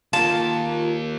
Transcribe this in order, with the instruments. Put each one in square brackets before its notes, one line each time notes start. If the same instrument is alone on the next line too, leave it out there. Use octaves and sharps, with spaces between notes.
[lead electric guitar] D#3 A#3 [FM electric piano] F4 A#4 [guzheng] A5